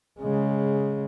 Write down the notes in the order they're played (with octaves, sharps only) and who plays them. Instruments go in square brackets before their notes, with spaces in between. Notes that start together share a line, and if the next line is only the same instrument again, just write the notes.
[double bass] C#3 G#3